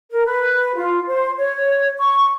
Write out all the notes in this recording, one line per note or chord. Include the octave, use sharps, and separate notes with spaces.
A#4
B4
F4
C5
C#5
C#6